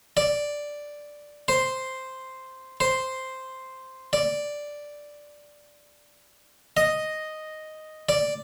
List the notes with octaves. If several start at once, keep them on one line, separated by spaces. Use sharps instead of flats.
D5
C5
C5
D5
D#5
D5